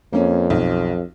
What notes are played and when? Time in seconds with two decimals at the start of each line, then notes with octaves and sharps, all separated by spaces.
0.13 F2 A#3 C#4
0.50 B1